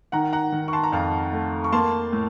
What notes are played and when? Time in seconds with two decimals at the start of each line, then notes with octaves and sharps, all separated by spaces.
0.12 D#3 F#5 A#5
0.33 F#5 A#5
0.52 D#3
0.68 C#6
0.73 A5 C6
0.84 A#5
0.92 F2 F5 A5
1.33 A3
1.64 C#6
1.72 A#3 A5 C6
2.12 A2